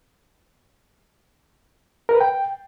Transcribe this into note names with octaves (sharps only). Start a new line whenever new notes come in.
A#4
B4
G5